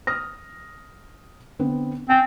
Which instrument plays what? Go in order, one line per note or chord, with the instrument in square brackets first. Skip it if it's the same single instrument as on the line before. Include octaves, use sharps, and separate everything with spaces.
[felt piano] D#6 F6 A#6
D3 B3 C4
[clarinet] C4 [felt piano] G5 G#5